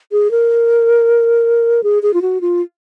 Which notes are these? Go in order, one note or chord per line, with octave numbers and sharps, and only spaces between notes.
G#4
A#4
G#4
G#4
F4
F#4
F4